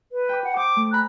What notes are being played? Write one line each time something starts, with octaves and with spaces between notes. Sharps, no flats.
B4
G5 B5 D6
F#5
C5 D6 D#6 G6
A3
G#5 A#5 B5 F#6